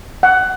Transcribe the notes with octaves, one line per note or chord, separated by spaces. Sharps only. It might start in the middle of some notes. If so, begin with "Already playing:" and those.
F#5